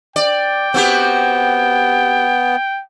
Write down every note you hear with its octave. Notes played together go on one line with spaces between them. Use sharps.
D5 G5
B3 C4 F#4 G4